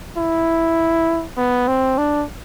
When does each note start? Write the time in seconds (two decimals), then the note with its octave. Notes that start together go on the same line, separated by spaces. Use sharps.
0.17 E4
1.37 B3
1.68 C4
1.98 D4